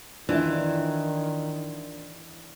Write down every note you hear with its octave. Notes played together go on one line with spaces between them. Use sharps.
D#3 E3 D4 E4 F4